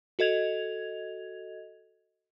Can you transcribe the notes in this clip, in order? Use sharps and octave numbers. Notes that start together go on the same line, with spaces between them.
F#4 A4 D#5 G#6 F7